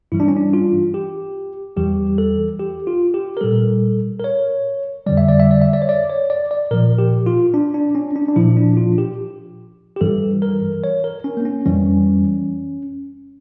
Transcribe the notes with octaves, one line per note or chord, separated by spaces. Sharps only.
G2 E3 G3 E4
D4
C#4
D4
F4
G4
E2 E3 G3 G4
A4
G4
F4
G4
A#4
A#2 G3 A4
A#4
C#5
F2 D3 G3 D5
E5
D5
E5
D5
E5
D5
C#5
D5
C#5
D5
D5
A#2 F3 A#4
G4
F4
D4
D4
C#4
D4
D4
A#2 F3 E4
D4
F4
G4
G4
G2 E3 G3 A4
A#4
C#5
A#4
C#4
A#3
C#4
F2 E3 G3 C#4